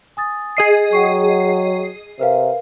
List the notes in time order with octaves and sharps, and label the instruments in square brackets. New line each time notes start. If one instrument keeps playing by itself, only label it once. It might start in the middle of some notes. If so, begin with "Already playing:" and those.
[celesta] G#5 D#6 A6
[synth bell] G#4 D#5 C7
[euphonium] F#3 [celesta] F#5 G5 C#6
[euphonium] C3 [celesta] A#4 B4 F5